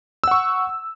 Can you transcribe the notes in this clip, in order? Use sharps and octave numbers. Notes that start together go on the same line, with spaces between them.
F#5 C#6 E6